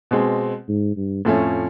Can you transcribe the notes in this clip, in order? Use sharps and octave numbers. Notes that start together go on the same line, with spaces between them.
B2 G#3 C4
G#2
G2
F2 A2 F3 A3 C#4